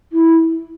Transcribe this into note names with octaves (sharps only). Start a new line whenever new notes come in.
E4